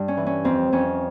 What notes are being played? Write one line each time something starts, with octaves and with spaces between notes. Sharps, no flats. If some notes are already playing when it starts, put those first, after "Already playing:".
Already playing: G2
C#4
E3
C#4
F2 C4
F2 C#4